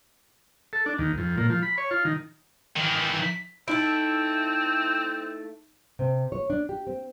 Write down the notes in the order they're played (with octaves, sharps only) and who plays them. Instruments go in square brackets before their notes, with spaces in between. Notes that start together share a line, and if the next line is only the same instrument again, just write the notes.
[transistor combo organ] A4
D4
D#2
F2
A#2
F3
B5
C#5
F4
D#3
[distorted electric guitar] D#3 E3
[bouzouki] A3 E4 [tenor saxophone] C4 [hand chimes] D#4 D7
[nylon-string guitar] C3
C#5
D4
G4
C4